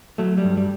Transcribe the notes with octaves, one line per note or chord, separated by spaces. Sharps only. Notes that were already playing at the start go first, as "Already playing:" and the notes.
F#3 A3
G3
G2
G3